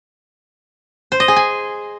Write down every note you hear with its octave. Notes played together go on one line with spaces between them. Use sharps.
C5
D#5
G#4
G#5